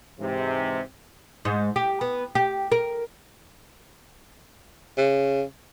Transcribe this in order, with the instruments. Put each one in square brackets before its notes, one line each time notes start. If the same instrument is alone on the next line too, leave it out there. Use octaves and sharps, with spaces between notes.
[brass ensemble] G#2 C3 E3
[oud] G#2
G4
B3
G4
A#4
[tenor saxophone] C#3